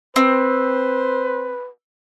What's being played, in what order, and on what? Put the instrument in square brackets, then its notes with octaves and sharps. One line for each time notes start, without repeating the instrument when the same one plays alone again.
[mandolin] C4 [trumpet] B4 [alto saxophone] C5